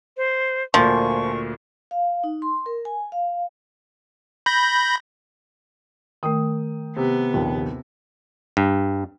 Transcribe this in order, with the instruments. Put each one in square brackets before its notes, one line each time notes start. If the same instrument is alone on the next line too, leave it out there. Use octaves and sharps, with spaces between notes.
[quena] C5
[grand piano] D2 A#2 [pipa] F3 [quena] C#6
[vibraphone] F5
D#4
C6
A#4
G#5
F5
[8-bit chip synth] B5 G6 A#6
[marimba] D#3 A3 [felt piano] A#4 G5 D#6
[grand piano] C3 [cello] B3
[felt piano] A#1 D#2
[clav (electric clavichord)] G2